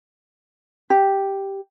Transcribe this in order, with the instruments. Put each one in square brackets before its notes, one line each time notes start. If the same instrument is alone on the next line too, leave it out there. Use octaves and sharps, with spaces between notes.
[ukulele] G4